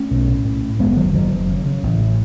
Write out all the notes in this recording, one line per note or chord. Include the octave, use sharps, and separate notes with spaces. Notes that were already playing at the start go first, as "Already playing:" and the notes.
Already playing: A3 C#4
B1
A2
A2
A2
F#1 G#3 B3
F#1 D#3 F#3
F#1 D#3 F#3
F#1
C#3
C#3
A1
A2